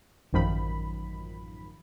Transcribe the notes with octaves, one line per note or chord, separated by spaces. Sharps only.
A1 F#2 D#3 F3 B5